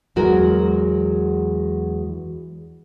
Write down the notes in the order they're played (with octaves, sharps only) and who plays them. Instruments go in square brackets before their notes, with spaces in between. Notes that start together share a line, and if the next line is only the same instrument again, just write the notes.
[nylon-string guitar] E2 F#3 G#3 F#4 A#4